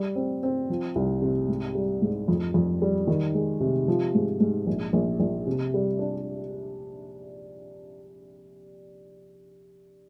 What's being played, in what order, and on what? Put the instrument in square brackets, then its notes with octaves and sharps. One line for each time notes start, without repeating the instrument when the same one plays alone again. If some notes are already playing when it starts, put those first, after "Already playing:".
Already playing: [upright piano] G3
C4
C4
F3
C2
C3
G#2
G3
G#2
F2
F2
G3
D#3
G#3
C3
F3
G#2
G#2
A#1
A#1
A#1
C3
G3
D4